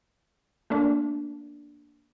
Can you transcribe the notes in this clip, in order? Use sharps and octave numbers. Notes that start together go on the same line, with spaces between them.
A3 A#3 D4